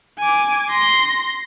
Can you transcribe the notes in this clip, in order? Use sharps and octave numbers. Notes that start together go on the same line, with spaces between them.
G#5 D6
C6 A#6